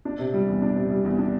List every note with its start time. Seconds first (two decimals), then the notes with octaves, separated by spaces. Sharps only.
0.05 D4
0.19 C3
0.34 G3
0.48 E2
0.62 D4
0.76 C3
0.90 G3
1.05 E2
1.19 D4